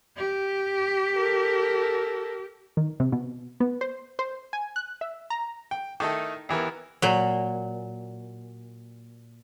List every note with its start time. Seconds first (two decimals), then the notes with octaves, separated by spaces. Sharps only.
0.17 G4
1.15 A4 A#4
2.77 D#3
3.00 C3
3.12 B2
3.60 B3
3.81 C5
4.19 C5
4.53 G#5
4.76 F#6
5.01 E5
5.30 A#5
5.71 G5
6.00 D#3 A3 D#4 E4 A4
6.49 D#2 E3 B3 A#4
7.02 A#2 F#3